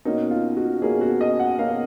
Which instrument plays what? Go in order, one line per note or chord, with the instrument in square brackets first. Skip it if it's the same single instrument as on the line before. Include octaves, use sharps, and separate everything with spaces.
[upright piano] B2 A#3 C#4 D#4
F4
F#4
B2 A#3 C#4 G#4
F#4
D#5
F#5
B2 A#3 C#4 F5